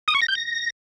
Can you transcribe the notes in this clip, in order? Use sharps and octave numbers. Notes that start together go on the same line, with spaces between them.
D#6
C#6
A#6
G6
A#6